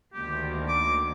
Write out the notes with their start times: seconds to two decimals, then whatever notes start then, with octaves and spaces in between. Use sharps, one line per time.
0.14 D2 D#3 A#3 G4
0.68 D6